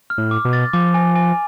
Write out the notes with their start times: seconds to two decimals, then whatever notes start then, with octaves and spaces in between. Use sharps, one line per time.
0.10 F6
0.18 A2
0.31 D6
0.45 B2
0.53 A6
0.73 F3 D6
0.94 G#5
1.15 G#5